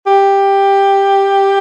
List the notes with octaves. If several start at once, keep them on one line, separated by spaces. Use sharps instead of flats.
G4